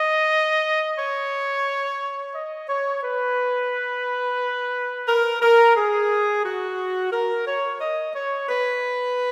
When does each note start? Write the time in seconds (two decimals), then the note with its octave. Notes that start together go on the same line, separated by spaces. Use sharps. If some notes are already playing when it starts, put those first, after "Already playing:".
Already playing: D#5
0.97 C#5
2.34 D#5
2.68 C#5
3.02 B4
5.07 A#4
5.41 A#4
5.76 G#4
6.44 F#4
7.12 A#4
7.46 C#5
7.80 D#5
8.15 C#5
8.49 B4